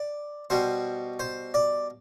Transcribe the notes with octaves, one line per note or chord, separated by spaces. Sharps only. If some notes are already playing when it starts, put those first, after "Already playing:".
Already playing: D5
B2 G3 C5
C5
D5